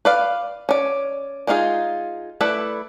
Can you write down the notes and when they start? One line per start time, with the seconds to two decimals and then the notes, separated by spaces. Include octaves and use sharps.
0.05 B4 D5 F5
0.69 C#4 D5
1.47 G#3 D4 D#4 F4 G#4
2.41 A3 E4 A4 B4 D5